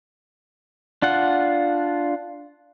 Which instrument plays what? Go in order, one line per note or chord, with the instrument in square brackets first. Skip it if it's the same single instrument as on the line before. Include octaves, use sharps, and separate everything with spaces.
[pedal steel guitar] D4 F4 F#5